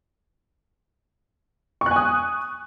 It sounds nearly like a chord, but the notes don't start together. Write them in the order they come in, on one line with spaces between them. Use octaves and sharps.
C#6 F#6 G#5 D#6